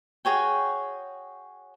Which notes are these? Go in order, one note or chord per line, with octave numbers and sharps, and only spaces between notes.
F#4 G#4 C#5 G5